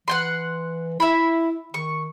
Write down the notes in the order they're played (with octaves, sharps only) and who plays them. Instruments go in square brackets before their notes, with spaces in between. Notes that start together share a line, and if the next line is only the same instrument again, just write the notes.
[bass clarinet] E3 [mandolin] F#5 G5 C6
[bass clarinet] E4 [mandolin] E5 B5
[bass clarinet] D#3 [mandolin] C#6